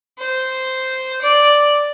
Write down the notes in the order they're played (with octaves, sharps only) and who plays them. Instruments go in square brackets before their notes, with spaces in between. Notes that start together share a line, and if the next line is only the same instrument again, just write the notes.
[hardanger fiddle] C5
D5